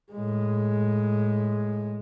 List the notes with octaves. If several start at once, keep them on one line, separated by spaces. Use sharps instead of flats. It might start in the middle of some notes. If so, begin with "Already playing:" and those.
A2 G#3